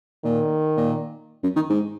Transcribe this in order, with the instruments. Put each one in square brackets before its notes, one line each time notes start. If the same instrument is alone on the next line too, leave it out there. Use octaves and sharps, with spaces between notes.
[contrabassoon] A#2 [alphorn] D#3
[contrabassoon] A#2
F#2
D#3
G#2